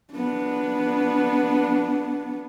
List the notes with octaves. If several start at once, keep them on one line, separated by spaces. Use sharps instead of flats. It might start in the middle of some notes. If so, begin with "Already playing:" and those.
B3 D4